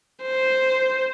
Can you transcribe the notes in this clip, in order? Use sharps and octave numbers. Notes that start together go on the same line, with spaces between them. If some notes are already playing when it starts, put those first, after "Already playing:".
C5